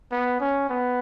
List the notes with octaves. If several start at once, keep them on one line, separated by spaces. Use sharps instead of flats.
B3
C#4
B3